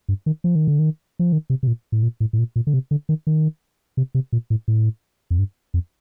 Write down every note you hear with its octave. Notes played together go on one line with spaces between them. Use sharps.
G2
D#3
F3
D#3
D3
D#3
F3
D#3
C3
C3
A#2
A2
A#2
A2
A2
A#2
A#2
D3
C3
D3
D#3
D#3
C3
C3
A#2
A2
A2
F2
G2
F2